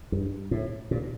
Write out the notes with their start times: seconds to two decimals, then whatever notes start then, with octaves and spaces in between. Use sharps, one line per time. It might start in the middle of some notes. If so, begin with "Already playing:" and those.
0.12 G2
0.51 A2
0.91 A#2